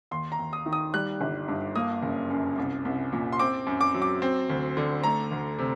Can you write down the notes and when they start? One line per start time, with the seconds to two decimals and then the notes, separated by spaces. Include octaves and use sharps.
0.11 D#2 C6
0.32 A#5
0.39 D#2
0.53 D#6
0.66 D#3
0.73 D#6
0.94 G3 F#6
1.21 G1
1.48 G2
1.75 A#3 D#6
2.03 F#1
2.30 F#2
2.58 C2
2.85 C2
3.13 A#2
3.33 C6
3.39 C4 D6
3.67 F#2
3.81 D6
3.94 F#3
4.02 D6
4.22 C4
4.50 D2
4.77 D3
5.04 A3 A#5
5.31 D2
5.59 C3